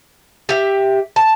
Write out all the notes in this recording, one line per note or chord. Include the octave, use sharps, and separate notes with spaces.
G4 E5
A5